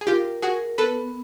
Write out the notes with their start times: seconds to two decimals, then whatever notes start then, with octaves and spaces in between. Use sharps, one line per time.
0.01 G#4
0.07 F4 G4 A#4
0.42 F#4 G#4 A#4
0.78 B3 A4 B4